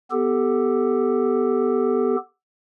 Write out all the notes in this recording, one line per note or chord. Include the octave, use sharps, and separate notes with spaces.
B3 G4 A4